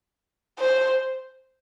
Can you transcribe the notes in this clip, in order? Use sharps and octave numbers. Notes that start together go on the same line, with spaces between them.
C5